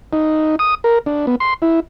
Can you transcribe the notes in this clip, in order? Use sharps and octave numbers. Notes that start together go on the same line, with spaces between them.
D#4
D#6
A#4
D4
B3
C6
E4